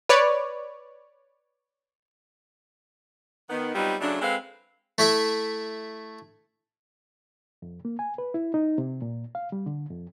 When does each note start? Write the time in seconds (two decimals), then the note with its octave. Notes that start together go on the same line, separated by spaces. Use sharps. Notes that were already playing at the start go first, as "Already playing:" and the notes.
0.09 B4 C#5 D5
3.50 D#3 B3
3.75 F#3 G3 B3 C4 D#4 F4
4.01 C#3 F#3 A3 D4
4.22 G#3 C4 A4 B4 F5
4.98 A3 E4 E5
7.62 F2
7.85 A#3
7.99 G#5
8.18 B4
8.34 E4
8.54 D#4
8.78 C3
9.02 A#2
9.35 F5
9.52 G3
9.66 D3
9.90 F2